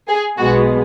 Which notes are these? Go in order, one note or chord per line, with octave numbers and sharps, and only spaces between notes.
G#4
B1 B2 G#3 B3 F#4